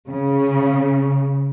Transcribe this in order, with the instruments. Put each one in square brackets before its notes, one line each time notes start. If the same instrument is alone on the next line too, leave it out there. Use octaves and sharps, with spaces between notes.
[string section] C#3